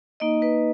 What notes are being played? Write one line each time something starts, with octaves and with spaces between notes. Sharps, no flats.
A#3 D#4 D#5
B4